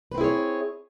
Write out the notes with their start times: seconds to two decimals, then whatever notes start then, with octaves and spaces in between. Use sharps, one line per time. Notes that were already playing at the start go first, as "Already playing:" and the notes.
0.12 B4
0.15 C4
0.18 E4
0.21 G#4
0.24 C#5